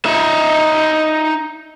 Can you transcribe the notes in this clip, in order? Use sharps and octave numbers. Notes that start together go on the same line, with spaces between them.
D#4 E5